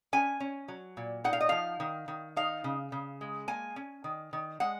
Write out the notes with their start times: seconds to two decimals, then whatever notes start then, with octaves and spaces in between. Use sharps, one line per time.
0.13 C#4 G#5
0.40 C#4
0.68 F#3
0.97 A#2
1.24 D#4 F#5
1.33 F5
1.40 D#5
1.49 F3 F5
1.80 D#3
2.08 D#3
2.36 D#4 F5
2.64 C#3
2.92 C#3
3.21 G#3
3.48 A#3 G#5
3.76 C#4
4.04 D#3
4.33 D#3
4.60 G#3 F#5